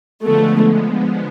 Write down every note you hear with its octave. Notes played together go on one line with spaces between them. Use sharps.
D3 F3 G#3 A3 B3